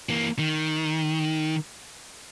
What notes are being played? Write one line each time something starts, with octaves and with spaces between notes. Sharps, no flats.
E3 A#3
D#3